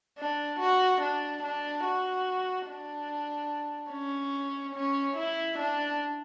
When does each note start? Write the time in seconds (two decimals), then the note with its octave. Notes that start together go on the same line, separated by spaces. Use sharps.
0.18 D4
0.60 F#4
1.01 D4
1.43 D4
1.85 F#4
2.67 D4
3.91 C#4
4.75 C#4
5.16 E4
5.59 D4